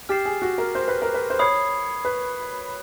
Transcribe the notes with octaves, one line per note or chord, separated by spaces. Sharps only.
G4 F6 A6 C7 E7
G#4
F#4
A#4
C5
B4
A#4
B4
C5
C#5 B5 D#6 G#6 C7
B4